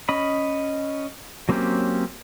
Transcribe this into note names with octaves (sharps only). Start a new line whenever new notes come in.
C#4 D#5 B5
F#3 A#3 C4 C#4 G4